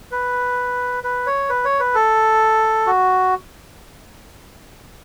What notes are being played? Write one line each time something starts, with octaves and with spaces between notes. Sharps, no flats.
B4
B4
C#5
B4
C#5
B4
A4
F#4